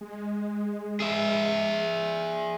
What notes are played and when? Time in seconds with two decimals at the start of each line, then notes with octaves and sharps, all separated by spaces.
0.01 G#3
1.00 G#4 E5